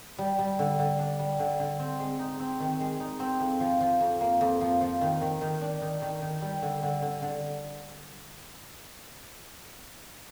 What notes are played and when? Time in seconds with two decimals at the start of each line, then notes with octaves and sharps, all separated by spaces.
0.18 G3
0.39 G3
0.59 D3
0.79 D3
0.99 D4
1.19 G3
1.39 D3
1.59 D3
1.79 C4
2.00 G#3
2.19 D#4
2.40 C4
2.60 D#3
2.80 G#3
3.00 D#4
3.20 C4
3.40 F2
3.60 F3
3.81 F3
4.00 F2
4.21 A#3
4.41 F2
4.61 F3
4.81 F3
5.01 D#3
5.21 D#3
5.41 D#3
5.61 D4
5.82 D#3
6.02 D#3
6.22 D#3
6.42 G3
6.62 D3
6.83 D3
7.02 D3
7.22 D3